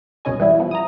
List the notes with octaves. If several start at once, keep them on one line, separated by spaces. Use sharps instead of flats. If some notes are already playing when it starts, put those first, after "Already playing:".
C2 F#2 B2 C#4 D#5 G#5
E3 G3 E4
F3 B3
A#5 D#6